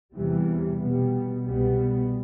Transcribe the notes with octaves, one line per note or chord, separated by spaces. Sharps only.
E2 C3 E3 G3
B2 G3 B3
C2 B2 G3 B3